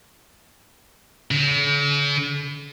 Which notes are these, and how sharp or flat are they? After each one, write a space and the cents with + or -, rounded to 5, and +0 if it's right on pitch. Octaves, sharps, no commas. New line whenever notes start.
D3 -45